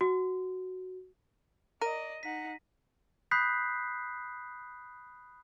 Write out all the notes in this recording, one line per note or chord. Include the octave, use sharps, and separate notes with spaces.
F#4
A#4 D5 D#5 A#6 D#7
D#4 F#5 B6
B5 D#6 F#6 G6 B6 C7